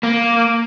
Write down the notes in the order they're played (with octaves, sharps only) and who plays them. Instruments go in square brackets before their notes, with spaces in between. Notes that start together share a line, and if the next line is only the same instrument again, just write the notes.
[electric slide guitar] A#3